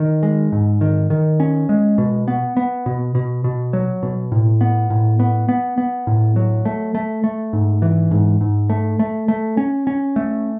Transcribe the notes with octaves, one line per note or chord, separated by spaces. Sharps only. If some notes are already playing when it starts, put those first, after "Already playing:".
Already playing: D#3
G#3
G#2
D#3
D#3
C#4
G#3
B2
B3
B3
B2
B2
B2
F#3
B2
A2
B3
A2
B3
B3
B3
A2
F#3
A3
A3
A3
G#2
E3
G#2
G#2
A3
A3
A3
C#4
C#4
A3